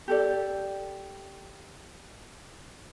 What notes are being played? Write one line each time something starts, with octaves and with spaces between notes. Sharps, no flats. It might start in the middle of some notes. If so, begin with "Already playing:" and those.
G4 A4 D5